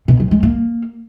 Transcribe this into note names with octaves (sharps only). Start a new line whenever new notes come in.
B2
F#3
G#3
A#3